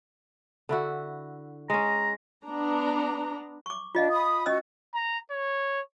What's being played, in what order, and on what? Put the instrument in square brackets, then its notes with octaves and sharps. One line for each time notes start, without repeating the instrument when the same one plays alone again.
[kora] D3 E4 F#4
[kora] G#3 C#4 [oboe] A#5
[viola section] B3 D4 A#5
[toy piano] C#6 D6
[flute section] D4 [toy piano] F4 D#5 F5
[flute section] B5 D#6
[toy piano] C#4 D#5 E6 [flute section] F#4
[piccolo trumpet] A#5
C#5